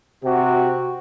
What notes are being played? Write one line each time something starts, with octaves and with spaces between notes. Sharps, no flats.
C3 F#4 G4